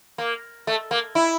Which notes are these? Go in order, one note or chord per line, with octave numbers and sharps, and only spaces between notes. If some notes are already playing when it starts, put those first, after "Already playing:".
A#3
A3
A#3
E4